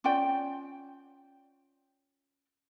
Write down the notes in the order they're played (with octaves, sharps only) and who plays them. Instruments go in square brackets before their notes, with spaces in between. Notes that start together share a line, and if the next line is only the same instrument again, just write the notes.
[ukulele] C#4 F4 D5 G5